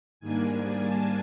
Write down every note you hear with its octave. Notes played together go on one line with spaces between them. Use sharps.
G#2 D#3 G3 A#3 D4 G#5
A5